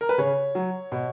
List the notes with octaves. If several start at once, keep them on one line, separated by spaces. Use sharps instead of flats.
A#4
B4
C#3 C#5
F#3
B2